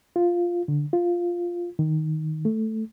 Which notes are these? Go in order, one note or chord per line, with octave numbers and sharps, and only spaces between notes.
F4
D3
F4
D#3
A3